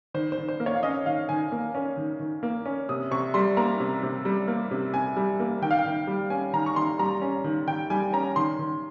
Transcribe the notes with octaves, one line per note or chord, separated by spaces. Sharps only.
D#3 C5
C5
D#3
C5
A#3
C#5
F5
C#4 D#5
D#3 F5
D#3 G#5
A#3
C#4
D#3
D#3
A#3
C#4
C3 D#6
C3 C#6
G3 C6
A#3 A#5
C3
C3
G3
A#3
C3
C3 G#5
G3
A#3
D#3 G5
F5
G5
D#3
G3
C#4 G#5
D#3 A#5
C#6
D#3 C6
G3 A#5
C#4
D#3
D#3 G5
G3 G#5
C#4 A#5
D#3 C6
D#3